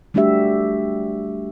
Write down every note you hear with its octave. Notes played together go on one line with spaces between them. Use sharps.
G3 A3 D4 F#4 G4 E5